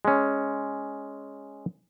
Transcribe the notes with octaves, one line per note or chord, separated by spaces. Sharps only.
G#3 C#4